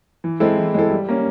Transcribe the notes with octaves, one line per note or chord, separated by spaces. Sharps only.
E3
G#3 C4 E4 A4
E3
G#3 C4 E4 A4
G3
A#3 C#4